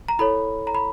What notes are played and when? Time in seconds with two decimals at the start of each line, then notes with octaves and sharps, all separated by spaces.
0.08 A#5
0.19 E4 A4 C#5 B5
0.67 A#5
0.75 B5